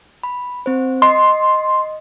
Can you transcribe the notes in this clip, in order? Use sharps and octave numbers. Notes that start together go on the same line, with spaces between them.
B5
C4 C5
D#5 C6